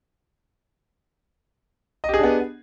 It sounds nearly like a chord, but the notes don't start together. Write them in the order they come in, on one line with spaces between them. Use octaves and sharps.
D#5 G4 G#4 D4 B3